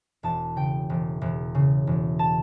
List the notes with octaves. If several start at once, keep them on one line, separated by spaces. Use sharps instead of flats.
E1 A5
C#3 G5
E1
E1
C#3
E1
A5